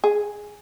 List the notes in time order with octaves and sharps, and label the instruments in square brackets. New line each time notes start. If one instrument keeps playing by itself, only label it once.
[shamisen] G#4